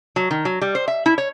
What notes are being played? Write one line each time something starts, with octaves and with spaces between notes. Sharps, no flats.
F#3
D#3
F#3
G3
C5
E5
E4
C#5